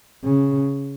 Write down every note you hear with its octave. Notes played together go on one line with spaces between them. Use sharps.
C#3